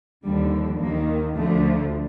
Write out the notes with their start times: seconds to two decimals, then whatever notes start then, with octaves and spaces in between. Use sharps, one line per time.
0.25 D#2 D3 F3 G3
0.80 D#2 D#3 A#3
1.36 D2 D3 F3 A3